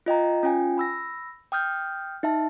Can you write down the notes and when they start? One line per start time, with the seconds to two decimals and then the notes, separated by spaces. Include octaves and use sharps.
0.06 F4 D#5 G5 A#5
0.43 C#4 F4 G5 G#5
0.78 B5 E6 A#6
1.52 G5 D#6 F6 G6
2.23 D#4 E5 A5